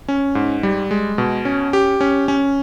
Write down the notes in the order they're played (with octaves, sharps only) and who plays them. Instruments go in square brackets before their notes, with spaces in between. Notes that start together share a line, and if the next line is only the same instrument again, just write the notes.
[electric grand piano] C#4
G#2
G3
G#3
B2
C#4
G4
C#4
C#4